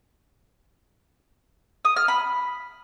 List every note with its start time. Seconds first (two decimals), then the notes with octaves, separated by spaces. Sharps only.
1.85 D#6
1.96 F6
2.08 B5